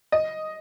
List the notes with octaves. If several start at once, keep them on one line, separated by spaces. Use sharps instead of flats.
D#5